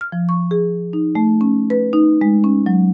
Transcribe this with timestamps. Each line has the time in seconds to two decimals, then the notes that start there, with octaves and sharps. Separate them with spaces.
0.01 F6
0.12 F3
0.29 C#6
0.51 G#4
0.93 D#4
1.15 A3
1.41 C#4
1.70 B4
1.93 D#4
2.21 G#3
2.44 C#4
2.66 F#3